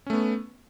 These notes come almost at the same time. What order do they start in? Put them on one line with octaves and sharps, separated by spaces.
C#4 A3 B3